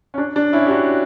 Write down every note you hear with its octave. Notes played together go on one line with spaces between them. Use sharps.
C#4
D4
D4
C#4 E4
G4
D4 F#4